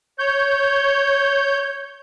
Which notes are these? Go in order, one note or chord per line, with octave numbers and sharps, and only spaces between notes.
C#5 G6